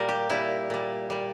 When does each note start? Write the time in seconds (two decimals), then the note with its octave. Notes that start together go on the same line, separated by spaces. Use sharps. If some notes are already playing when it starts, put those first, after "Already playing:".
Already playing: A#2 G3 A#4
0.09 G4
0.29 A#2 G3 E4
0.70 A#2 G3
1.10 A#2 G3